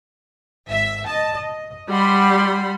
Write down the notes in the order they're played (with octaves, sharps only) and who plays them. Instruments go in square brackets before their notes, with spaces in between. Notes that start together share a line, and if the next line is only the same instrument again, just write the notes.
[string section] G#1 E5
D#5 A5
D#5
[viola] G3 [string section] F#5 B5 C6